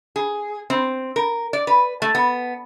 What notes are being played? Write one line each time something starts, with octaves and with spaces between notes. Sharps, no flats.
G#4
C4
A#4
D5
B4
A3
B3